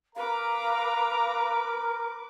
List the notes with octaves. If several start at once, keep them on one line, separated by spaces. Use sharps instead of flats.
A#4 B4 F5 A#5 D6